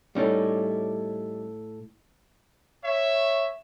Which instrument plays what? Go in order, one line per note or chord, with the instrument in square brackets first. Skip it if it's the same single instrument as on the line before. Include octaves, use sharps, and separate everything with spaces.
[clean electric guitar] A2 E4 A4 [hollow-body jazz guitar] G3 C#4 D#4
[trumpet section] C#5 E5